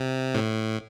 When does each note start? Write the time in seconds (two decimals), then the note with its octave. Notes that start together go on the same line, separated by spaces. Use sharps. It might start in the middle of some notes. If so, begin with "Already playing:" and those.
Already playing: C3
0.35 A2